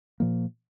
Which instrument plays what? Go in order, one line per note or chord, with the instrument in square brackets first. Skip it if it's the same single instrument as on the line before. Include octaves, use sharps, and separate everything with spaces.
[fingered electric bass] A#2 F3 A#3